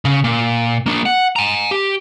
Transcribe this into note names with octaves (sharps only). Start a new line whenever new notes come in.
C#3
A#2
A#3 D4
F#5
G#5 A#5
G4